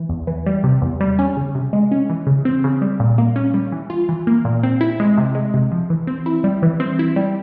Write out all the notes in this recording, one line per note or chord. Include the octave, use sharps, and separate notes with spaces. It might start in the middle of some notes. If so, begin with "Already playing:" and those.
Already playing: E3
E2
E3
G3
C3
E2
G3
C#4
C#3
C3
G#3
C#4
E3
C#3
C4
C#3
G3
A#2
A#3
C#4
G3
E3
F4
E3
A#3
A#2
C4
E4
G#3
C3
G#3
C3
F3
E3
C4
E4
G3
E3
C4
E4
G3